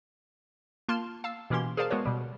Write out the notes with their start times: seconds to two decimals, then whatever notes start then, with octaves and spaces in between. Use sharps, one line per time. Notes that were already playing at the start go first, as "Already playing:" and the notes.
0.88 A#3 F4 A5 C6 F6
1.24 F5 A5 E6
1.50 B2 E3 A#3 C#4 G4 C6
1.77 G#4 A#4 C5 D5 F5 A5
1.90 G#3 B3 F#4 A#4 B4 C#5
2.05 B2 G3